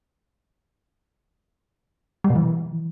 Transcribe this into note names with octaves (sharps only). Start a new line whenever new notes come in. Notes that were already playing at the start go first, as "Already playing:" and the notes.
G3
B2
E3